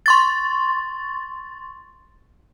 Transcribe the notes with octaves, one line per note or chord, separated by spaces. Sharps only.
C6 C#6 A6